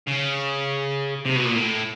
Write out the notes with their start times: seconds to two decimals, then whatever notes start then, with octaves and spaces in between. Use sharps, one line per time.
0.08 C#3
1.26 C3
1.36 B2
1.45 A#2
1.56 A2